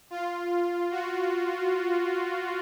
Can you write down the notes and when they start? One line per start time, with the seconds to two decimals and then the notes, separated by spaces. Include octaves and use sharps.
0.11 F4
0.91 F#4